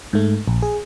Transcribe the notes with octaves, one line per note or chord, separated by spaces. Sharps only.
G#2 A3
A#1
G#4